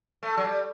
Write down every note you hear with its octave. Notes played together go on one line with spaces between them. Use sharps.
A3
F#3
G3